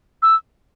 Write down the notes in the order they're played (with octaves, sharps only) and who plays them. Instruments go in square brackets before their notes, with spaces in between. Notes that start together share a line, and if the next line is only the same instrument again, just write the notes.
[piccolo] E6